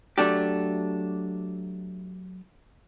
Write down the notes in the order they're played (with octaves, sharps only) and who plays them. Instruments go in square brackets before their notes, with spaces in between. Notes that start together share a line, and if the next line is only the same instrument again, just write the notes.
[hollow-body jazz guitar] F#3 A3 D4 G4